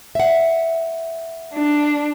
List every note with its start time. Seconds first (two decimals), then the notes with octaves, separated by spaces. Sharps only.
0.15 E5 F#5
1.54 D4